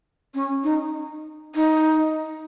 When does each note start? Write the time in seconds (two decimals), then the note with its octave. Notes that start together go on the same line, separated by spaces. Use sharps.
0.34 C#4
0.64 D#4
1.55 D#4